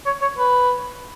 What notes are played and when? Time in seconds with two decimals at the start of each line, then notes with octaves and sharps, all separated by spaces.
0.06 C#5
0.21 C#5
0.39 B4